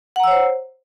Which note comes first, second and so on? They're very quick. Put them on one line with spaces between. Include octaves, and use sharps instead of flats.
F#5 A#5 E6 C#5 C5